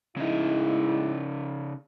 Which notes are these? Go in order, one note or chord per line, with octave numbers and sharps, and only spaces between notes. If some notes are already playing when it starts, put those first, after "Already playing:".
A2 C#3 G#3 D#4 E4